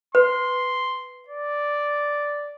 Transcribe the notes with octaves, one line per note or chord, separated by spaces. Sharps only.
B4 C6
D5